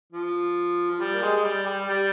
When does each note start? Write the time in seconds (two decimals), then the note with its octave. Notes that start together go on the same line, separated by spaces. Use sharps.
0.12 F3
0.90 F3
1.00 G3
1.13 A#3
1.22 G#3
1.36 G#3
1.44 G3
1.66 G3
1.89 G3